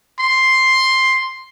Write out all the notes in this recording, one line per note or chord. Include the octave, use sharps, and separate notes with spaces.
C6